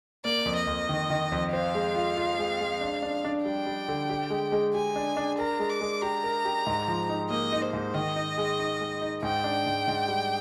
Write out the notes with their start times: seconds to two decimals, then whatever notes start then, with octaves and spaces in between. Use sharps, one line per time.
0.25 A#3 D5
0.45 F2
0.56 D#5
0.67 F2
0.89 D#3
1.10 D#3
1.32 F2
1.53 C5 F5
1.75 G#3
1.95 F4
2.17 F4
2.39 G#3
2.60 G#3
2.81 D4
3.02 D4
3.25 D4
3.45 G3 G5
3.66 G3
3.88 D3
4.09 G4
4.30 G#3
4.52 G#3
4.74 G4 G#5
4.96 D4
5.17 D4
5.38 A#4 A#5
5.59 G#3
5.69 D6
5.81 G#3
6.02 G4 A#5
6.24 A#4
6.45 G4
6.67 G#2
6.88 F3
7.09 D#4
7.30 A#3 D#5
7.52 D#4
7.62 C5
7.73 G#2
7.94 D#3 D#5
8.16 D#4
8.38 G#3
8.59 D#4
8.80 G#3
9.01 D#4
9.23 G#2 G5
9.44 D4
9.66 G#2
9.88 G#2
10.08 G3